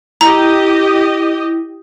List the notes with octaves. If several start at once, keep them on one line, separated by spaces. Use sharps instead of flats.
E4 G4 D#5 A#5